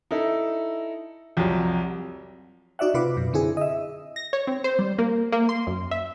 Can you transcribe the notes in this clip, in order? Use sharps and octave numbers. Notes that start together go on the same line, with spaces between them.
D#4 E4 A4
C2 F2 F3 F#3
D#4 F#4 D5 E5 F#5
C3 F4 B4 D6
F#2 B2
D3 C4 E4 G#4
D#5 E5
A#6
C#5
C4
C5
G3
A#3
A#3
C6
F#2
E5